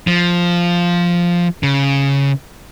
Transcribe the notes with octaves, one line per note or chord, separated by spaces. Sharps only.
F3
C#3